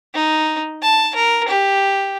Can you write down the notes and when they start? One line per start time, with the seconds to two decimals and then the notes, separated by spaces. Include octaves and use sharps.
0.14 D#4
0.82 A5
1.15 A#4
1.48 G4